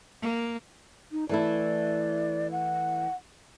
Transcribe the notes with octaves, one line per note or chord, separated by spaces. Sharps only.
A#3
D#4
E3 A3 E4 D5
F#5